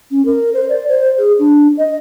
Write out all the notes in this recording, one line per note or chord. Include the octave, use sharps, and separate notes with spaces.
C#4
A#4
C5
D5
C5
G#4
D4
D#5